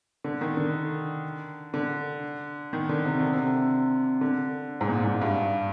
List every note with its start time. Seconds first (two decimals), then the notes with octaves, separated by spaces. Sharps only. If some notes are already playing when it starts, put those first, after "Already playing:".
0.24 D3
0.41 D#3
0.57 D3
1.74 D3
2.73 D#3
2.89 D3
3.05 C3
3.20 D3
3.33 C3
4.21 D3
4.81 G#2
4.88 A#2
5.05 G#2
5.21 G2